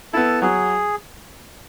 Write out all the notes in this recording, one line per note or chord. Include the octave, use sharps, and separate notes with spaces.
B3 E4 A4
F#3 G#4